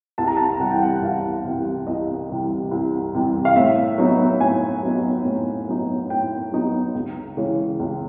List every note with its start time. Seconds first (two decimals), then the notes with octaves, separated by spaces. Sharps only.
0.18 C2 A5
0.28 A#5
0.37 A5
0.60 C3 E3 G3 F#5
0.71 G5
0.82 F#5
0.96 F#5
1.02 C2 F5
1.44 C3 E3 G3
1.87 C2 D#5
2.29 C3 E3 G3
2.71 C2
3.14 C3 E3 G3
3.45 F5
3.56 A2 E5
3.98 F#3 B3 D#4
4.40 A2 G#5
4.83 F#3 B3 D#4
5.25 A2
5.68 F#3 B3 D#4
6.10 A2 G5
6.52 F#3 B3 D#4
6.95 C#2
7.37 C#3 E3 G#3
7.79 C#2